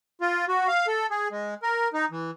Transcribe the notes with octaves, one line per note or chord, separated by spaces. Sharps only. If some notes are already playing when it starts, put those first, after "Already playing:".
F4
F#4
F5
A4
G#4
G#3
A#4
D#4
E3